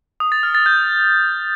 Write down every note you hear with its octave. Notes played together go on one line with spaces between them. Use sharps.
D#6
A6
F6
A6
G6